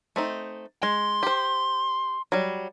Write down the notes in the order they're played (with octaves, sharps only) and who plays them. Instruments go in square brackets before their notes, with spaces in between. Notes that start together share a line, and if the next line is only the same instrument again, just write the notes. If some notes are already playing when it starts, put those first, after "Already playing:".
[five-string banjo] A3 C4 D#4
[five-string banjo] G#3 [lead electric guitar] C6
[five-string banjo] G4 C5
F#3 G3